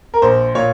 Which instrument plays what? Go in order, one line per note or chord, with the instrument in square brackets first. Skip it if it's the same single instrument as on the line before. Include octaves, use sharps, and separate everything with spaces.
[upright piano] A#4
A#1 C5
A#2 C#5